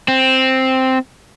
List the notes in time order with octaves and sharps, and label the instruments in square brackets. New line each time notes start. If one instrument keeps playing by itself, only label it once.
[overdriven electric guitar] C4